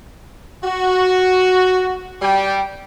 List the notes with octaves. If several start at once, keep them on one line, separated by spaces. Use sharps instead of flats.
F#4
G3 G5